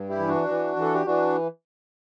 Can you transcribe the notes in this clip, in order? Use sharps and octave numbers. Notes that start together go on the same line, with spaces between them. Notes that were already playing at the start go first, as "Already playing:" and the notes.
Already playing: G2
E4 G4
E3
D4 F#4
E3
E3
A4
G4
E3 D4 F#4